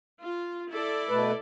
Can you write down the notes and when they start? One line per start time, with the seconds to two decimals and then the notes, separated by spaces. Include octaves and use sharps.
0.21 F4
0.72 E4 A4 D5
1.09 B2 A3 B4